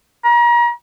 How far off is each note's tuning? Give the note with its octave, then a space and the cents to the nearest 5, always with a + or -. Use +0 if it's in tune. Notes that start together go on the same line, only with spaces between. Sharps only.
A#5 +35